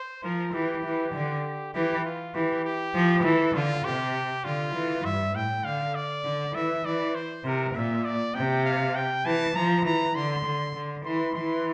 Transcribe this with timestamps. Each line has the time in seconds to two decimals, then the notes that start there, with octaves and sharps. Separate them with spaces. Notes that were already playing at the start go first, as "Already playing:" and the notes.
Already playing: C5
0.23 F3 A#4
0.54 E3 G4
0.84 E3
1.15 D3
1.74 E3 G4
2.05 F4
2.35 E3 G4
2.65 G4
2.94 F3
3.24 E3 A4
3.54 D3 F4
3.85 C3 G4
4.45 D3 F4
4.75 E3
5.05 G2 E5
5.35 A2 G5
5.64 D3 F5
5.95 D5
6.24 D3
6.55 E3 E5
6.85 E3 D5
7.15 C5
7.45 C3 A#4
7.75 A#2 E5
8.05 D5
8.35 C3 G5
8.65 F5
8.96 G5
9.26 E3 A5
9.56 F3 A#5
9.85 E3 A#5
10.15 D3 C6
10.45 D3
10.75 D3
11.05 E3 C6
11.35 E3 C6